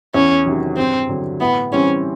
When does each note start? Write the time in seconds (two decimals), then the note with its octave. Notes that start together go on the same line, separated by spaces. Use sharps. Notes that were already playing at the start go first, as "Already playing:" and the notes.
0.14 E2 C#4
0.46 C3 D#3 F#3
0.77 G2 C4
1.09 D3 F#3
1.40 A2 B3
1.72 E3 G3 C4 C#4